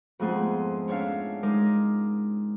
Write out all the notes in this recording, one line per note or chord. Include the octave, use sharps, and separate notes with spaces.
F2 G#2 A3 B3 G#4 C6
C#4 D4 C#5 E5 F5
G#3 D#4 A#4 D6